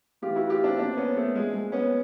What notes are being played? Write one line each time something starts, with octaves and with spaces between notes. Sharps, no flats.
A2 E3 F4 G4
E4 F#4
F4 G4
C4 D4
A#2 F3 C4 D4
B3 C#4
A3 B3
A#2 F3 G#3
G#3
B3 C#4